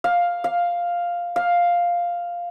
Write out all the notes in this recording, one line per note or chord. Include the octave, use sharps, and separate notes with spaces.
F5
F5
F5